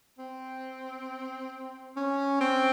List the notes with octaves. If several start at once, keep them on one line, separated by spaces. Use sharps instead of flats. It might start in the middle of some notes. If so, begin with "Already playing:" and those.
C4
C#4
C4